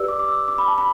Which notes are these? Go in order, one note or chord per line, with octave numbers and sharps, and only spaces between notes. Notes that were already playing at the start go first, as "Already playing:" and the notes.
Already playing: G4 B4 D5 E6
D6
D6
E6
D6
B5
A5
B5